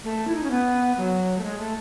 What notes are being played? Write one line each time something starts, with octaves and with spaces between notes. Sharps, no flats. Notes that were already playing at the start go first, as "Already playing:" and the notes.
A3
E4
D#4
C#4
B3
F#3
A3
G#3
A3